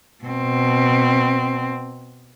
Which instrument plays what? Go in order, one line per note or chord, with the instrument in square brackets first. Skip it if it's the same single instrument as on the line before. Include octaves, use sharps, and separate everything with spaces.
[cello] B2 C4